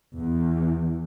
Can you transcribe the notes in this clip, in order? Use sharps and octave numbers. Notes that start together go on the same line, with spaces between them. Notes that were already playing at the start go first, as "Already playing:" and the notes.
E2